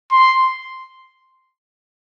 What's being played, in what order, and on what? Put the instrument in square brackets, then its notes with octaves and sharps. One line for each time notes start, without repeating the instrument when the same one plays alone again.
[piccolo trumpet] C6